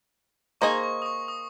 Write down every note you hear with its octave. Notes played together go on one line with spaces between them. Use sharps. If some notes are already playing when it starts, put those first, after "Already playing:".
A#3 D#4 G#4 C5 D#5 C#6
C#6
D#6
C#6
D#6